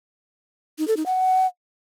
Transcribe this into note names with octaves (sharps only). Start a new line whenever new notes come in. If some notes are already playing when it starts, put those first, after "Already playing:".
D#4
A4
D#4
F#5